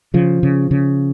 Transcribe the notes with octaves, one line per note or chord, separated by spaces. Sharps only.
C#3 F3
C#3
C#3